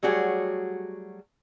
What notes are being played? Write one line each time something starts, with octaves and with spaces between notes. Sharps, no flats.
F#3 G3 A3 F#4 G#4 C#5